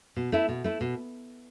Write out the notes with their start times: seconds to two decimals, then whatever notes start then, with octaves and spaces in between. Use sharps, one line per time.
0.16 B2
0.32 A3 E4
0.49 B2
0.64 A3 E4
0.81 B2